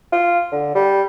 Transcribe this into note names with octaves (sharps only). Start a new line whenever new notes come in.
F4
D3
G3